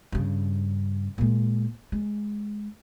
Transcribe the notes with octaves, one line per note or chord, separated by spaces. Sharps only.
G2 C#3
A#2 G#3
G#3